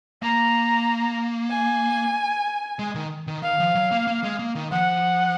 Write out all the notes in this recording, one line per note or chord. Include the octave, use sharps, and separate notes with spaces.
A#3 A#5
G#5
G#3
D#3
D#3
D#3 F5
F3
F#3
A#3
A#3
G#3
A#3
D#3
F3 F#5